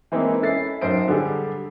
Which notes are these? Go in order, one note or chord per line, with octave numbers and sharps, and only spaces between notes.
E3 G#3 A#3 C4 D#4 E4
C#4 E4 A4 A6 C7
B1 F#2 C5 C7 D7
D3 G3 G#4 A4